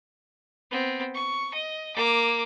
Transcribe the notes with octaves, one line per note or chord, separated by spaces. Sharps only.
B3 C4
C#6
D#5
A#3 D6